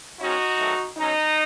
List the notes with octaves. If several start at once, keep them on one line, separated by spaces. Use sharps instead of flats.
G#2 D#3 G#3 C#4 D#4 F#4
G#2 D#3 F#3 A3
B2 F#3 C#4 D#4